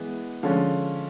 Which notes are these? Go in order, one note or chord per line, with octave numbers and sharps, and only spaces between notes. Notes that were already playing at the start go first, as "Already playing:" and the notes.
Already playing: E3 G#3 B3
D3 F3 G#3 C#4